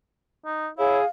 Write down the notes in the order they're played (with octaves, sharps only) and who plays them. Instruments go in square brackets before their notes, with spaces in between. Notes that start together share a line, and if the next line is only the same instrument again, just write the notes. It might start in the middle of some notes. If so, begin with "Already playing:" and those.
[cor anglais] D#4
[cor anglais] E4 [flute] G#4 [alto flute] C#5 [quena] F5